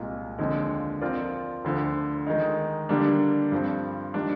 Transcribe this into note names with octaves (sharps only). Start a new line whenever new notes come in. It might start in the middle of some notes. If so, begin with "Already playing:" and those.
Already playing: C2 A#2 G#3
D#2 D3 F3 G#3 C4
F3 C4 F4 A#4 D5
D2 D3 F3
D#3 G#3 D#4
D3 G3 A#3 D4
G2 F3 C4
D#3 G3 A#3 D4